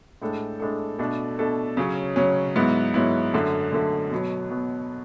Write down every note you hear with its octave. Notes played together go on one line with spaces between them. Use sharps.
A2 G#3 D4 A4
A2 G#3 D4 A4
B2 A3 D4 A4
B2 A3 D4 A4
C#3 F#3 C#4
C#3 F#3 C#4
G#2 F#3 B3 E4
G#2 F#3 B3 E4
F#2 D3 A3
F#2 D3 A3
B2 F#3 B3
B2 F#3 B3